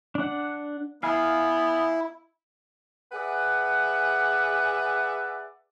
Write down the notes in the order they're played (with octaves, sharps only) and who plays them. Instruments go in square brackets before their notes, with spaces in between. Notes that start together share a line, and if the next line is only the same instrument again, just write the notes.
[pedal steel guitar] D4 F#5
[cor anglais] B3 [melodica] E4 [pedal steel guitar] F5 G#5
[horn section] G#4 B4 D5 E5 F#5